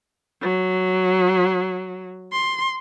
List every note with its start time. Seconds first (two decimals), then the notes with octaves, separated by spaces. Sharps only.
0.42 F#3
2.32 C6